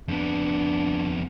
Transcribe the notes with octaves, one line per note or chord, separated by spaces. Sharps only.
F2 B3 D4